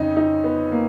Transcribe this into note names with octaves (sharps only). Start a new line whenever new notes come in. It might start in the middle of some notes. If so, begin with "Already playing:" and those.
Already playing: F2 C#3 C#4 D#4
D#4
B3
A#3